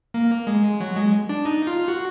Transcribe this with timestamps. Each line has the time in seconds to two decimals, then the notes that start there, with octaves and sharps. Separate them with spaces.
0.14 A#3
0.47 G#3
0.81 F#3
0.96 G#3
1.29 D4
1.45 D#4
1.67 F4
1.80 F4
1.88 F#4